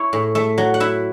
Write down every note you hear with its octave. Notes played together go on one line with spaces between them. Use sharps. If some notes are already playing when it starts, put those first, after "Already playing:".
Already playing: E4 C#5
A2
A3 E5
F#3
F#5
E4 E5